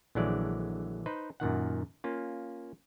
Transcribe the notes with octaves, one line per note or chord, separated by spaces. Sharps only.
A#1 D3 E3 F#3 G#3 D5
D#4 B4 C5
F#2 A#2 D#3 F#5
A#3 C#4 F4